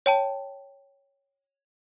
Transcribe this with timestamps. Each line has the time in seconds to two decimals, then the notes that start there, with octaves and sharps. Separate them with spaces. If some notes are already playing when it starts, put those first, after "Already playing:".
0.06 C#5 G5 A5